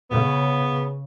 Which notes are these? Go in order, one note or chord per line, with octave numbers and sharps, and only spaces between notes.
C#3 B3